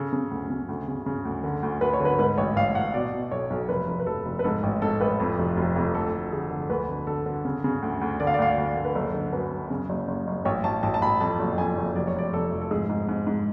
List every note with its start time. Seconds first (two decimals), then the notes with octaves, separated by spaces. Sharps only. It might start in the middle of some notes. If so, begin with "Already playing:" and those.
Already playing: C#3 A4
0.13 C#3
0.31 D2
0.50 C#3
0.69 D2
0.88 C#3
1.06 C#3
1.25 D2
1.44 D3
1.63 D2
1.81 D2 B4
1.93 C#5
2.00 D3 B4
2.19 G#2 B4
2.38 A1 C#5
2.56 A1 F5
2.75 A1 F#5
2.94 B2 D5
3.13 B2
3.32 B1 C#5
3.50 B1
3.69 F1 B4
3.88 F1
4.00 B4
4.07 F1 A4
4.26 F1
4.39 B4
4.44 G#2 A4
4.63 A1
4.82 G#2 A4
5.01 A1 B4
5.20 F2
5.39 F1
5.57 F1
5.76 F2
5.95 D2 A4
6.13 D2
6.32 D3 G#4
6.51 D3
6.70 D2 B4
6.89 D3
7.07 D3 A4
7.26 D3
7.45 C#3
7.64 C#3
7.82 D2
8.01 D2
8.20 D3 D5
8.27 F5
8.34 D5
8.39 D2 F5
8.49 D5
8.58 D2
8.77 D3
8.85 B4
8.95 F#1 A4
9.14 D3
9.32 F#2 B4
9.51 F#2
9.70 C#3
9.89 F#1
10.08 F#1
10.27 F#1
10.45 A1 C#5
10.64 A1 A5
10.83 A1 A5
10.94 A5
11.02 A1 B5
11.21 F2 A5
11.39 F#1
11.58 F2 G#5
11.77 F#1
11.96 F1 D5
12.07 C#5
12.14 F1 D5
12.33 F2 A4
12.52 F1
12.61 A4
12.71 G#2 G#4
12.89 G#2
13.09 G#2
13.27 G#2